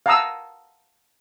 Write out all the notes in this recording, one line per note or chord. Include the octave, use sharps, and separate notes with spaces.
F5 F#5 A5 A#5 D#6 E6